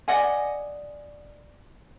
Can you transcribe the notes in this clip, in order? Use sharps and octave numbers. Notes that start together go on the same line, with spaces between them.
D5 D#5 F#5 G#5